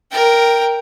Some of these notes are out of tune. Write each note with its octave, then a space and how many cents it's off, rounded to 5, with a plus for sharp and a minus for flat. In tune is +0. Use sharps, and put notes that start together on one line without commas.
A#4 +0 G5 +0